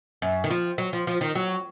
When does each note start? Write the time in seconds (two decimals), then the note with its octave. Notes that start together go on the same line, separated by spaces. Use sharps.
0.22 F#2
0.44 D#3
0.50 F3
0.78 F#3
0.93 F3
1.07 F3
1.21 D#3
1.35 F#3